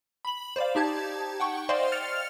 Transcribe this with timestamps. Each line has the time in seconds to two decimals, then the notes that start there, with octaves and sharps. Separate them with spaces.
0.25 B5 F#7
0.56 C5 D5 F5
0.75 D#4 G4 A5 G#6
1.40 F#5 G5 C#6
1.69 C5 D5 D#5 F5 G5 C6
1.92 F6 A6 C#7 F7